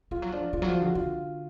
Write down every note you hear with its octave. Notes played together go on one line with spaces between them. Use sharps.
F3 F4
F#3
F3 D4
D3 F4
F#3 F#4
F3
F4
D3 F#4
D3 F4